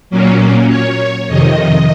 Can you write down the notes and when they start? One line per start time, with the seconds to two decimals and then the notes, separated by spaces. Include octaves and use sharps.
0.10 A#2 F#3 A#3 C#4
0.69 C#5
1.28 F2 C3 D#3 D#5